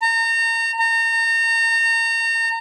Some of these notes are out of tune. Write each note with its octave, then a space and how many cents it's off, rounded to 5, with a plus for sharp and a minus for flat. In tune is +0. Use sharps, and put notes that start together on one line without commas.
A#5 -35
A#5 -35